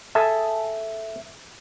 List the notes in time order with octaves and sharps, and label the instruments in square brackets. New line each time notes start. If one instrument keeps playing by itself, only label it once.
[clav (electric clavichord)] G#4 A4 G#5 [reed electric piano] E5